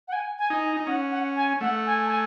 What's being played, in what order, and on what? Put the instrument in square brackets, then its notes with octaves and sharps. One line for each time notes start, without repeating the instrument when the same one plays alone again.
[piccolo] F#5
G#5
G#5
[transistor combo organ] D#4
[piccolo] G#5
[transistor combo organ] D#4
[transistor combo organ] C#4 [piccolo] F#5
[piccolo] F#5
G#5
[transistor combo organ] A3 [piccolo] F#5
[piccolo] G#5
A5
G#5